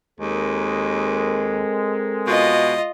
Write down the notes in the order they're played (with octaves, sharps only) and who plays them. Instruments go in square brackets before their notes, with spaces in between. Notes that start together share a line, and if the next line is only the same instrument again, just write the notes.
[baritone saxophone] D#2 [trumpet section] G#3 [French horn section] C4 A4 A#4
[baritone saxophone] B2 [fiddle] F4 D#5